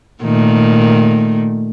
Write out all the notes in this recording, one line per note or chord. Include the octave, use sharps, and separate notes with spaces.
A#2 D#3 A3